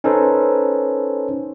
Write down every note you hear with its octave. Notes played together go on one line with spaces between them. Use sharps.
C#4 D#4 A4 B4 C5 D#5